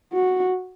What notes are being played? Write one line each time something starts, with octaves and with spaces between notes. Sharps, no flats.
F#4